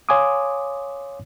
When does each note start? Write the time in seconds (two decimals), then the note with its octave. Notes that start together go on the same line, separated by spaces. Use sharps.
0.09 C#5 F5 G#5 C6 D6 D#6